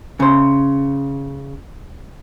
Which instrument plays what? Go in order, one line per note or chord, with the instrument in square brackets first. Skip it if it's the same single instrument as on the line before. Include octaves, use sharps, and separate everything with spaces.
[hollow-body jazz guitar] C#3 C5